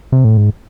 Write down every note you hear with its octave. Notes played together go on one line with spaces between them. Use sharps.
C3
A2
G#2